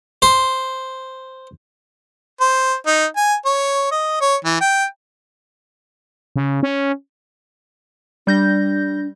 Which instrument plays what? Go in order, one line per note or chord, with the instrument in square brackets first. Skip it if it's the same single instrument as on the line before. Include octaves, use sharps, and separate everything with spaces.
[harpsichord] C5
[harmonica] C5
D#4
G#5
C#5
D#5
C#5
E3
G5
[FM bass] C#3
C#4
[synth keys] G3 G6 A#6 [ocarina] D4